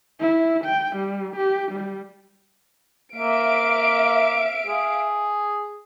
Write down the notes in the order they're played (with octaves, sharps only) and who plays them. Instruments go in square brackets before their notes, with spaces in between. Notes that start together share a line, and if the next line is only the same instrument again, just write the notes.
[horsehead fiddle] E4
G5
G3
G4
G3
[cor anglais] A#3 [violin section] E5 F5 D7
[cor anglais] G#4